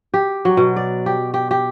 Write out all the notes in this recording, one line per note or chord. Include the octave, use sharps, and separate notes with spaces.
G4
F#3
B2
D5
G4
G4
G4